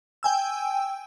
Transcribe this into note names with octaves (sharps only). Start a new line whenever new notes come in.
G5 G#5 E6